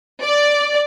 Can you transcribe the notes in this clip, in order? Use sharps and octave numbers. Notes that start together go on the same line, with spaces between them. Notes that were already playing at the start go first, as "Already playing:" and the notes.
D5